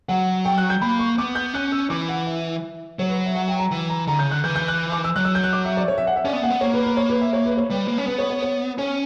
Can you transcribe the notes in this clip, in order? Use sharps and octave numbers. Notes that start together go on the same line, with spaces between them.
F#3 F#5
G5
F#6
G6
A#3 B5
C#6
B3 D6
G6
C#4 F#6
E6
E3 D6
F#5
E5
F#3 C#5
B4
E5
F#5
G5
A#5
E3
A#5
D3 A#5
C#3 G6
D3 F#6
E3 G6
G6
F#6
D6
E6
F#3 F#6
E6
G6
F#6
D6
E5
D5
C#5
E5
F#5
E5
C#4 D5
B3
A#3 F#5
B3
A#3 C#5
B4
B4
C#5
B4
E5
C#5
B4
C#5
G3 B4
A#3
C#4
B3 B4
C#5
C#5
C#5
C#4 C#5